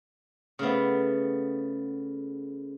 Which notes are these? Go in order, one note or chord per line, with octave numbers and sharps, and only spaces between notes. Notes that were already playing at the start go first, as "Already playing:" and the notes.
C#3 A3 B3